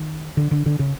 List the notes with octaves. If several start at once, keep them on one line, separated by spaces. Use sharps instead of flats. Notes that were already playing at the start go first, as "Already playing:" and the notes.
Already playing: D#3
D3
D3
D3
C#3